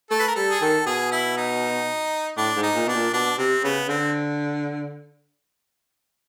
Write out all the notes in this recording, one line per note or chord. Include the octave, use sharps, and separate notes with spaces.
A3 A4
B4
A#4
G3 A4
G#4
D#3 A4
B2 G#4
E4
D#4
A2 D4
G#2
D#4
A#2
B2 D4
A#2
B2 D4
C3 C4
C#3 B3
D3 C4